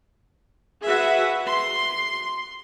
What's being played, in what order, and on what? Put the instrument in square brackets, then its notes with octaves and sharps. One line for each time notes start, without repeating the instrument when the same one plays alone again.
[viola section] F#4 G#4 B4 E5
C6